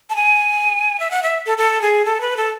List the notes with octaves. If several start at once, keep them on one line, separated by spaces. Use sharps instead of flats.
A5
G#5
E5
F#5
E5
A4
A4
G#4
A4
B4
A4